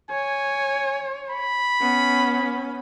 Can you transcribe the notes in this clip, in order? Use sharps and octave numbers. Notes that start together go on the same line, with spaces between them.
C#5 G#5
B5
B3 C#4